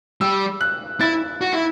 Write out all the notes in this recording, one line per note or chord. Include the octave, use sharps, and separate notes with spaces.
G3 E6
F#6
E4 A6
F#4
E4